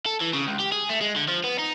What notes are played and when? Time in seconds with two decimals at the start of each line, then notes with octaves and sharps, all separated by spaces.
0.06 A4
0.21 E3
0.33 C#3
0.47 C#2
0.59 G4
0.72 G#4
0.89 A3
1.01 G#3
1.16 D3
1.28 F3
1.44 B3
1.59 D#4